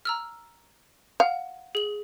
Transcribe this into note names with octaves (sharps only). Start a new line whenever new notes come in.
A#5 E6 F6
F5 F#5
G#4 F#7